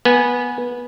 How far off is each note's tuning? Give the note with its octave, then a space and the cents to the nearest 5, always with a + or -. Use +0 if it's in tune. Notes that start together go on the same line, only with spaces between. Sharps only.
B3 -15 G#5 +0